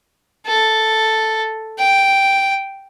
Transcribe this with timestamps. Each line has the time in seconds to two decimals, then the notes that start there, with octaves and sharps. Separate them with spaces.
0.46 A4
1.79 G5